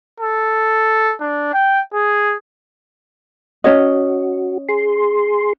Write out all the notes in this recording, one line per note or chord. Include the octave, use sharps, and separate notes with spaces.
A4
D4
G5
G#4
C#4 F#4 C#5 D#5
G#4 C6